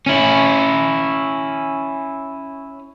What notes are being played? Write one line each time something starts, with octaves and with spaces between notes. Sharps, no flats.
C#4 E4